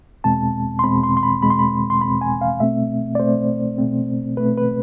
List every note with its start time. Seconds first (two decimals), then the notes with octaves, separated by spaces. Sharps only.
0.24 E2 B2 G#3 C4 A5
0.79 C6
0.83 E2 B2 G#3 C4 B5
1.03 C6
1.17 C6
1.23 B5
1.42 E2 B2 G#3 C4 B5
1.50 C6
1.59 B5
1.90 C6
2.01 E2 B2 G#3 C4 B5
2.21 G#5
2.41 F5
2.60 B2 A3 C4 E5
3.15 D5
3.20 B2 A3 C4 C5
3.78 B2 A3 C4
4.37 B2 A3 C4 B4
4.57 B4